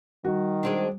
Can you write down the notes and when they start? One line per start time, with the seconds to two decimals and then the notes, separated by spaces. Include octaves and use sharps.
0.25 D#3 G3 F#4
0.63 G#3 C4 D4